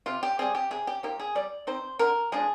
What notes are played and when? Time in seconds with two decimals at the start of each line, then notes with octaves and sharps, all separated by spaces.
0.06 C3 F4
0.23 G4
0.39 G3 C4 G#4
0.55 G4
0.71 C3 G#4
0.87 G4
1.03 F3 A#3 D#4 G4
1.20 G#4
1.35 G3 D5
1.67 C4 D#4 C5
1.99 D3 A#4
2.32 F3 G#3 D4 G#4